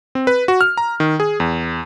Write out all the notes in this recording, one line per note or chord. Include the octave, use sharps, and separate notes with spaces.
C4
B4
F#4
F6
A#5
D#3
G#4
E2